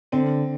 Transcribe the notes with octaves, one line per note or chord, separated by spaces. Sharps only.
D3 C4